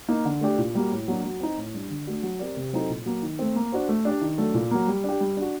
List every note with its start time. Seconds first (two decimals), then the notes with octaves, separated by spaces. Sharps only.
0.08 A#3 D#4
0.25 D3
0.41 A3 D4 G4 D5
0.58 A#2
0.75 G3 A#3 F#4
0.91 A2
1.08 F#3 A#3 D4 F#4
1.24 F#3
1.41 C4 D#4
1.57 A2
1.74 G3 D4
1.90 D3
2.07 A3 D4 F#4
2.23 F#3
2.39 C4 G4 A#4 D5
2.57 C3
2.73 F#3 C4 D#4 A4
2.90 A#2
3.06 F#3 A#3
3.22 D#3
3.39 A3 C4
3.56 A#3
3.72 D4 F#4 C5
3.89 A3
4.05 D4 G4 D5
4.21 D#3
4.38 F#3 A3 D4 A4
4.54 A#2
4.71 F#3 A#3
4.88 G3
5.04 D4 G4
5.20 G3
5.37 D4 F#4